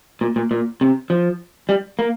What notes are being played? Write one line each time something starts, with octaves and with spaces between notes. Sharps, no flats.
A#2
A#2
A#2
C3
F3
G3
A#3